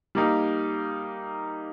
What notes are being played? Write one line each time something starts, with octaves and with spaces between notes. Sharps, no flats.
G3 A#3 D#4